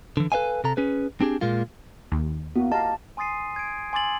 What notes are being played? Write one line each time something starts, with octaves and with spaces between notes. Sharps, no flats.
D3 E3
A4 B4 C5 E5 F5 G#5
C3 A4 A#5
C#4 G#4 B4
C4 D4 G4 G#4
A#2 G#3 A#3 F4
D#2
A#3 B3 E4 F#4
G4 D#5 F5 A5 A#5
G#5 C6 D#6 A6 C7 D#7
G#6 D7
G#5 C6 D6 E6 A6 F#7